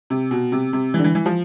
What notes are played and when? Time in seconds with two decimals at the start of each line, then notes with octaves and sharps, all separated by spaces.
0.10 C3
0.31 B2
0.52 C3
0.73 C3
0.94 E3
0.99 D3
1.04 E3
1.15 E3
1.26 F3